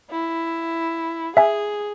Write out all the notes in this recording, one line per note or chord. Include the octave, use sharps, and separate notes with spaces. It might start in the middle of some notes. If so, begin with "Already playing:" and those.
E4
G#4 E5 G#5